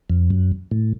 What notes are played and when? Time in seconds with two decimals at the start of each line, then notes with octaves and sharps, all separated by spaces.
0.10 F2
0.30 F#2
0.71 A2